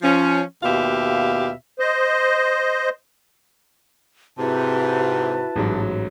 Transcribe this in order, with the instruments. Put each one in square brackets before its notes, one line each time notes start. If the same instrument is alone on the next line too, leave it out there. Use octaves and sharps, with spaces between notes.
[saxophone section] F3 C#4
D#2 B2 F4 G4 E5 F5
[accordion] C5 D#5
[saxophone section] G#2 C3 [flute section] E4 F#4 A5 [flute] B4
[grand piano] A1 G#2 F#3